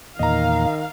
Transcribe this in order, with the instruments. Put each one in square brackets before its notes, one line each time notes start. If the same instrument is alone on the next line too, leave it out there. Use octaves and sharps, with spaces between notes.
[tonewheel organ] E2 A#2 [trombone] D#3 [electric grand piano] D#5 A#5 [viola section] F5